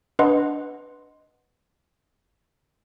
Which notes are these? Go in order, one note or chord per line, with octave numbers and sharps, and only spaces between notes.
D4 B4 D#5 F#5 C6